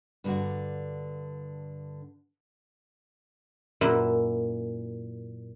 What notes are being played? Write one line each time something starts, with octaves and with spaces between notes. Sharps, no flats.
G2 D3 F#4
F#2 A#2 E4